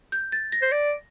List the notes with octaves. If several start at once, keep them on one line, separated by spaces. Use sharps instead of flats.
G6
A6
A#6
C5
D5